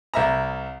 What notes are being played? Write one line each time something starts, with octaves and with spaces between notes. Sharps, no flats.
C2 E5 A#5